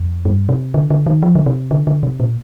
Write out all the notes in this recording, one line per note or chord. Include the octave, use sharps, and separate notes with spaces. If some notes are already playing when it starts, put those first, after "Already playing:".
Already playing: F2
G2
C3
D3
D3
D#3
F3
D3
C3
D3
D3
C3
A#2